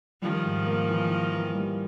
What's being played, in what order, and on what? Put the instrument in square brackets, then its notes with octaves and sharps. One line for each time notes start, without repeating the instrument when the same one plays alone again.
[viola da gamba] D#3 F3 [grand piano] G3
[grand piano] G#2
A#3
E3
E3
E3
G3